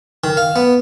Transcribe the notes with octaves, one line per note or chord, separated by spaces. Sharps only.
D#3
F5
B3